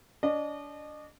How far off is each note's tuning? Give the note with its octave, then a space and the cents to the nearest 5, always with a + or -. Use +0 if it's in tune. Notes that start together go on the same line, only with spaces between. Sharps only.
D4 -35 D#5 -40